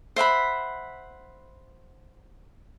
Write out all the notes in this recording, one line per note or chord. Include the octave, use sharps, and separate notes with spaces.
C5 E5 F#5 B5